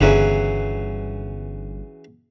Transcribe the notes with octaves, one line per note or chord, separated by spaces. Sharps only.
G1 C#3 E3 F#3